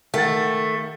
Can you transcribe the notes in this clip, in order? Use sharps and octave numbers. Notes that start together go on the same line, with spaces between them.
D#3 A3 F#5 A6